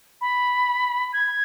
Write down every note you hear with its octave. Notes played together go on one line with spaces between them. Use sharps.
B5
G#6